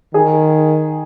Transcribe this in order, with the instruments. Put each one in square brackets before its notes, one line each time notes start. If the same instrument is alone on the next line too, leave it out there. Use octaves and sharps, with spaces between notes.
[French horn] D#3 [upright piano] G#4